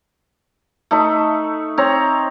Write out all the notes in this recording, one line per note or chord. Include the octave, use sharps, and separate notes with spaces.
A3 D#4 E5
C4 C#5 A#5